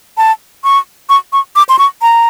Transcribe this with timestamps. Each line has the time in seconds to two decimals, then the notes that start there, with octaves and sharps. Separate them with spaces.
0.17 A5
0.64 C#6
1.09 C#6
1.33 C#6
1.56 D6
1.69 C6
1.79 C#6
2.02 A#5